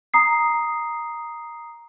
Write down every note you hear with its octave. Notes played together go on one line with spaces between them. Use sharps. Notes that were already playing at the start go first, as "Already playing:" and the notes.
A#5 D#6 C7